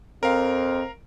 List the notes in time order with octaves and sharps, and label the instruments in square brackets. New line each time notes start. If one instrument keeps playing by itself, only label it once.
[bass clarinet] F2 [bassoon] C4 [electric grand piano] A#4 F5